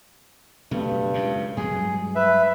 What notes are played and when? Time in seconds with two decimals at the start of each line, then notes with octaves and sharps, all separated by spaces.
0.71 F#1 G2 B2 A3
1.14 C#2 F#2 C#3
1.57 G2 F#3 G#3 G#4
2.15 B4 E5